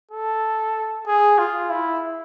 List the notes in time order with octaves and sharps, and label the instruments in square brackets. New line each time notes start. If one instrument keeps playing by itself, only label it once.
[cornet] A4
G#4
F4
E4